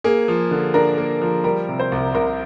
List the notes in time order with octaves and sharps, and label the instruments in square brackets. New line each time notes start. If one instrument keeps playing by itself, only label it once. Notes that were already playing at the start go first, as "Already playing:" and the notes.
[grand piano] A#3 [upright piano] G#4
[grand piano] F3
D3
[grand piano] D4 [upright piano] A#4
[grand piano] A#3
F3
[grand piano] G3 [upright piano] A#4
[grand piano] C3
[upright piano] C5
[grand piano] C2
[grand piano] C2 [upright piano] A#4